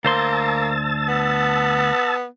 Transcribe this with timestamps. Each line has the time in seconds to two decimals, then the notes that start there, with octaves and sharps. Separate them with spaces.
0.04 D2 A#3 C5 A5 C6 E6 A6
1.08 B3